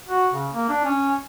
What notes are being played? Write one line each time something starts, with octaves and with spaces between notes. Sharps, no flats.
F#4
C#3
A#3
D4
C#4